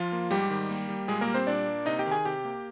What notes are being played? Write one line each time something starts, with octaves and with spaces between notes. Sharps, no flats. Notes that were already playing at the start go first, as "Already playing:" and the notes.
Already playing: F3 F4
A#3
G#2 G3 G4
D#3
A#3
G3
A#2 G#3 G#4
A#3 A#4
G3
C4 C5
A#2 D4 D5
A#3
C3 D#4 D#5
G4 G5
D#3
G#4 G#5
C3 G4 G5
A#3